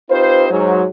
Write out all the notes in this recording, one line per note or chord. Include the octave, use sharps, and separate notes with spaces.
C4 D#4 F4 G4 B4 C5
G#2 F#3